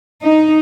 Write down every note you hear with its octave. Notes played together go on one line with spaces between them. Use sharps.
D#4